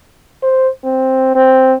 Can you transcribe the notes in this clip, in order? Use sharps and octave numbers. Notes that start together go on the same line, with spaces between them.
C5
C4
C4